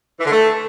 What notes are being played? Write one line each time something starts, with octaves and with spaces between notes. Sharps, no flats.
E3
D3
A3